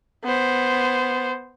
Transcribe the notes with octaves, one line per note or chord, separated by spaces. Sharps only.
B3 C5